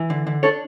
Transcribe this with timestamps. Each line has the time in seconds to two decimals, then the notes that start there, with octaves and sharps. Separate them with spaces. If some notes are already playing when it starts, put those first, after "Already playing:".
Already playing: E3
0.10 D3
0.27 D3
0.43 D4 A4 C#5